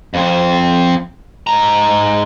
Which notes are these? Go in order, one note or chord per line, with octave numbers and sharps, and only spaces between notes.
F2 C4
G#2 A#5